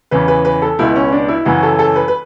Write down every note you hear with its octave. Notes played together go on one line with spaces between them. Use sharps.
E2 C#3 E3 B4
B4
B4
A4
C#2 B2 E4
C#4
D4
E4
F#2 C#3 E3 F#4
A4
A4
B4
B4